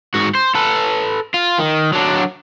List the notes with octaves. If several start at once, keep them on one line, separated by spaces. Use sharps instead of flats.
G#2 F#4
C5
A4 B4
F4
D#3
F#3 D4